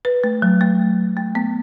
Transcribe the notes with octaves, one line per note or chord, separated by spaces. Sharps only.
B4
A3
F#3
A3
A3
B3